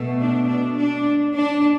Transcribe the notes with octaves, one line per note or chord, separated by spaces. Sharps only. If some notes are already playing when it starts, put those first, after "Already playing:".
Already playing: B2 A3
D4
D4
D4
D4